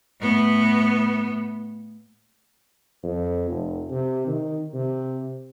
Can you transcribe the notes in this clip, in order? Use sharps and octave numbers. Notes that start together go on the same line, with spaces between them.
A2 B3
F2
F1
C3
D#3
C3